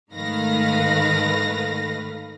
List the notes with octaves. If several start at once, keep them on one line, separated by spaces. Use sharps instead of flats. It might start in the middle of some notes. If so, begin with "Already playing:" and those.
G#2 D#3 A3 B4 F5 A#6